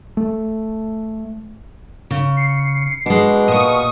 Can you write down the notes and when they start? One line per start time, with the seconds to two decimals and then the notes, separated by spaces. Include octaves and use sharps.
0.17 A3
2.11 C#3
2.37 C7 C#7
3.06 B2 G#3 D4
3.48 A#2 C#6 D#6